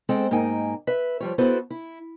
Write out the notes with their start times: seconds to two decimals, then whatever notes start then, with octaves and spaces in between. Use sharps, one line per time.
0.09 G#3 C4 A4 C5 G5
0.31 G#2 A#3 D#4 G5 G#5
0.87 B4 E5
1.20 F3 G3 C#5
1.38 B3 E4 F#4 A4 B4 C5
1.70 E4